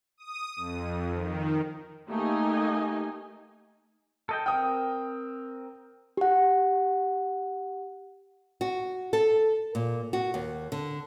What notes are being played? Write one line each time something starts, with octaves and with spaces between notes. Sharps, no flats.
D#6
F2
D#3
A3 A#3 D#4 G4 D#5 G#5
A4 D#5 G5
C4 A#4 G5 D#6 F6
G4 F#5
F#4
A4
A#2
F#4
D#2
D3